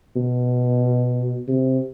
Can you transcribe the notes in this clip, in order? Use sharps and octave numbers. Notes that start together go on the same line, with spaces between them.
B2
C3